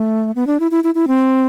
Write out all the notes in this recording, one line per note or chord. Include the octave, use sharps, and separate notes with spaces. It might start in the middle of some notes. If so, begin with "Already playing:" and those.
Already playing: A3
B3
D4
E4
E4
E4
E4
C4